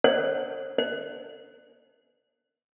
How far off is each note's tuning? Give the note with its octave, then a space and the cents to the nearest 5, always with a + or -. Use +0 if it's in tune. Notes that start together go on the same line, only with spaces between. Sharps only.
C5 +40
C5 +15